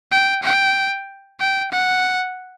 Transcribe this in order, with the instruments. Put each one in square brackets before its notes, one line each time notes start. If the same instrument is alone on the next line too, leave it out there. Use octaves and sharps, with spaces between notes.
[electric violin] G5
G5
G5
F#5